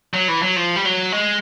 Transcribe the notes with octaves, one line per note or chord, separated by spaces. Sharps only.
F#3
E3
F#3
F3
G3
F#3
G#3